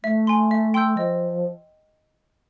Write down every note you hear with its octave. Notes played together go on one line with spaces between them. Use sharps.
A3 E5
G#5 C6
E5
G5 C6 E6 G6
F3 D#5